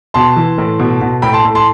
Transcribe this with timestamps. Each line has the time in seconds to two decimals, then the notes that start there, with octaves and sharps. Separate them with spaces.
0.14 B2 A5 C6
0.36 E3
0.58 A2
0.80 B2
1.01 B2
1.22 A2 G5 B5
1.33 A5 C6
1.45 A2
1.55 A5 C6